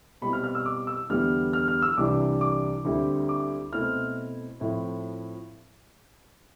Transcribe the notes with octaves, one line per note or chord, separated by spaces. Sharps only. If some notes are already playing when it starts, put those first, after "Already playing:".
B2 G3 C4 E4 B5
F6
F6
E6
D6
E6
E2 D3 G3 B3 E4 F6
F6
F6
E6
C2 C3 E3 G3 D4 D6
D6
D2 D3 G3 C4 E4
D6
B2 A3 C4 E4 F6
A2 F3 C4 E4